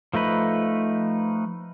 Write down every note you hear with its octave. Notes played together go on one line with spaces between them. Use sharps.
F3 A3 D#4 B4